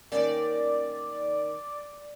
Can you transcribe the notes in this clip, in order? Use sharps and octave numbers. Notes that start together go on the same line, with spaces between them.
D#3 A#3 C#4 D5